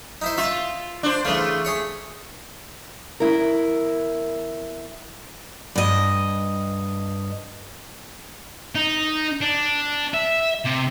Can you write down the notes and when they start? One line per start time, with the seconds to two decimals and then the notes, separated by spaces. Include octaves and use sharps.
0.22 D#4 E4 C5
0.38 F4 E5
1.03 D4 C5
1.25 C#3 E3 A3 F4
1.65 G#4 C#5 C#6
3.20 E2 E4 A#4
5.76 G2 D#5
8.75 D#4
9.41 D4
10.14 E5
10.65 C3